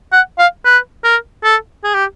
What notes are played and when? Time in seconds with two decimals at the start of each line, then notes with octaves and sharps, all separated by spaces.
0.12 F#5
0.39 F5
0.65 B4
1.04 A#4
1.44 A4
1.84 G#4
1.94 G4